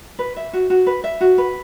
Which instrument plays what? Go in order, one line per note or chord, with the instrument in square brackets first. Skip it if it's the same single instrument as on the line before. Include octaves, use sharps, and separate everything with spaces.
[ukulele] B4
E5
F#4
F#4
B4
E5
F#4
B4